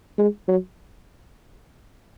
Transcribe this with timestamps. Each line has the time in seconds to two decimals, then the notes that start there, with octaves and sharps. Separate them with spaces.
0.18 G#3
0.48 F#3